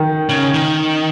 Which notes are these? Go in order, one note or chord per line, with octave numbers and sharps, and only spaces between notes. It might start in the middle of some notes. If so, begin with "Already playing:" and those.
Already playing: D#3
C#3
D#3